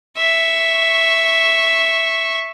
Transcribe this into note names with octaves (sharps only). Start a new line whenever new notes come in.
E5 C#6